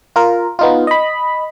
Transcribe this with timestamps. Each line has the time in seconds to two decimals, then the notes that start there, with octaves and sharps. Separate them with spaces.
0.16 F4 A#4
0.59 B3 D#4 F4
0.87 D#5 B5